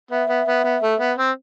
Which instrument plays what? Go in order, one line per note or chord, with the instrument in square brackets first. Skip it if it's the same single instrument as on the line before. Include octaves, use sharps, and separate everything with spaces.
[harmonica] B3 [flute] E5
[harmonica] B3
B3
B3
A3
B3
C4